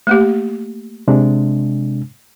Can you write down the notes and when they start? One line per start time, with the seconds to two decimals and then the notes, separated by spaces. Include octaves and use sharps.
0.07 A3 A#3 G4
1.08 C3 G#3 D4